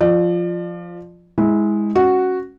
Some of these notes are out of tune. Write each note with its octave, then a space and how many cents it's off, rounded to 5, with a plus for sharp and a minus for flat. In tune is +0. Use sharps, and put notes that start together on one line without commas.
F3 +0 D5 +35
G#3 +0 E4 -25
C#4 +0 F#4 +0